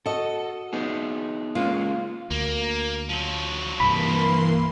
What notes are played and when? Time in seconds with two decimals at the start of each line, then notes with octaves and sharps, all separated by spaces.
0.06 F#4 A4 D#5
0.73 B3 D#4 G#4
1.55 G#3 A#3 C#4 F4
2.31 D2 A#3
3.09 F3 F#3
3.80 C2 G2 E3 A#3 B5 C6